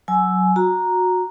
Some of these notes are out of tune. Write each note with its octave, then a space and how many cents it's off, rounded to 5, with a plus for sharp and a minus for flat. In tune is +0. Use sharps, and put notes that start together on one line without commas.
F#3 +0 G#5 +20 E6 +0
F#4 -20 A#5 +0